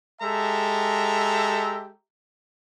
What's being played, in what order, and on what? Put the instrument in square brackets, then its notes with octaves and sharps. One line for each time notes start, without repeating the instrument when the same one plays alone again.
[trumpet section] G#3 G4 A4 E5 A#5